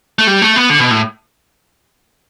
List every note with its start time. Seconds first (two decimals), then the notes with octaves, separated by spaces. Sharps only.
0.19 A3
0.27 G3
0.42 A3
0.56 B3
0.70 D3
0.80 B2
0.91 A2